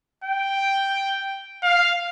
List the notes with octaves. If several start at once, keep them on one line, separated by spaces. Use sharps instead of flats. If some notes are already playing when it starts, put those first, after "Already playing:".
G5
F5